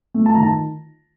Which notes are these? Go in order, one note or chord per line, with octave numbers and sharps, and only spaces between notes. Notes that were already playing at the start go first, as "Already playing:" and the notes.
A3
A5
D#3 A#5
A5